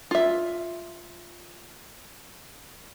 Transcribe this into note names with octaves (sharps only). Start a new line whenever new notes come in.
F4 E5